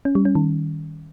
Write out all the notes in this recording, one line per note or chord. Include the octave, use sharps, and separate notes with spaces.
C#4
G3
C#4
D#3